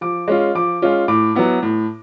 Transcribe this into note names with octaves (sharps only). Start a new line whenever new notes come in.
F3 D6
G#3 C#4 F4
F3 D6
G#3 C#4 F4
A2 D6
F#3 B3 E4
A2